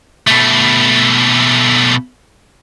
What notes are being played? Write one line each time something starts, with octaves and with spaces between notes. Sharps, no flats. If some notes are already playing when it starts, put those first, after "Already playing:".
B2 A3